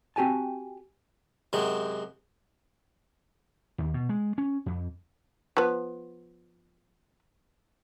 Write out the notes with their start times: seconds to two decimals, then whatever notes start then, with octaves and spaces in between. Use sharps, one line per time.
0.16 C4 F#4 G4 G#5 A5
1.53 F#2 C3 G#3
3.78 D#2
3.94 B2
4.09 G#3
4.38 C#4
4.66 F2
5.57 F3 B3